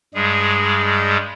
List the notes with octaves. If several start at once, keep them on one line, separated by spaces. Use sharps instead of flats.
G2 G3 G#3 G#4